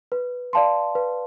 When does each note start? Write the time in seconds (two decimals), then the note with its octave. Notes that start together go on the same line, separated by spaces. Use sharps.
0.12 B4
0.53 D5 F5 A5 C6
0.95 B4